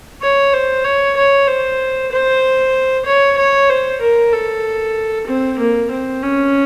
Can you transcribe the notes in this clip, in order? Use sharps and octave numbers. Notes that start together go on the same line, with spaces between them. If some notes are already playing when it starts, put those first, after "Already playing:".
C#5
C5
C#5
C#5
C5
C5
C#5
C#5
C5
A#4
A4
C4
A#3
C4
C#4